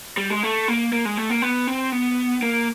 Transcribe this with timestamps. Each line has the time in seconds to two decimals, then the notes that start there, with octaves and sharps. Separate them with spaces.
0.17 G3
0.30 G#3
0.43 A3
0.68 A#3
0.93 A#3
1.05 G#3
1.17 A3
1.30 A#3
1.42 B3
1.67 C4
1.92 B3
2.43 A#3